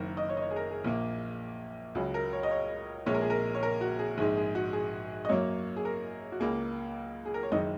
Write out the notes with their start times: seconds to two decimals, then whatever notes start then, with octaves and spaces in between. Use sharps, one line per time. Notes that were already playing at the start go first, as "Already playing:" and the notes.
Already playing: F#1 F#2 D#3 A#4
0.17 D#5
0.29 C#5
0.37 D#5
0.42 C#5
0.51 G#4
0.56 A#4
0.71 G#4
0.84 A#1 A#2 A#3
1.95 C#2 C#3 F#3 G#4
2.14 A#4
2.33 C#5
2.43 D#5
2.51 C#5
3.06 A#1 A#2 G#3 C#5
3.14 A#4
3.21 G#4
3.30 A#4
3.55 C#5
3.63 A#4
3.81 F#4
3.99 G#4
4.18 A#1 G#2 G#3 G#4
4.37 G#4
4.55 F#4
4.73 G#4
5.25 D#5
5.29 F#2 F#3 A#3 C#5
5.76 G#4
5.85 A#4
6.32 F#4
6.40 C#2 C#3 A#3 G#4
7.26 G#4
7.34 A#4
7.43 C#5
7.51 F#1 F#2 D#3 G#3 D#5